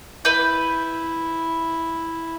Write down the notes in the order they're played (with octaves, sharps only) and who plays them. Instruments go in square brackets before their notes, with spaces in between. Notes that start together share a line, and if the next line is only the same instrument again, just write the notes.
[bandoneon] E4 [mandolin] B4 B5 G6